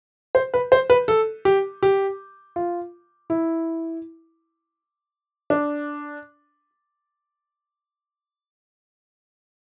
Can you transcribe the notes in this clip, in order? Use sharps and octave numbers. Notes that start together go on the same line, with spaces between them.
C5
B4
C5
B4
A4
G4
G4
F4
E4
D4